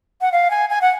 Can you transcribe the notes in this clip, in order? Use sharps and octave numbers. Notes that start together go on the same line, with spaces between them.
F#5
F5
G#5
G#5
F#5